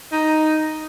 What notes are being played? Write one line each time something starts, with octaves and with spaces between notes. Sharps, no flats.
D#4